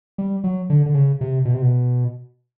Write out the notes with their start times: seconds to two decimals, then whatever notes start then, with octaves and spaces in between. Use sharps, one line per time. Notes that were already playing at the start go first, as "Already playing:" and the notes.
0.18 G3
0.44 F#3
0.70 D3
0.86 D3
0.94 C#3
1.21 C3
1.45 B2
1.54 C3
1.62 B2